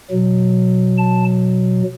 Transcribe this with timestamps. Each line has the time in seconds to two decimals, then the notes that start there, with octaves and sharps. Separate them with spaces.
0.10 B2 F#3
0.98 A5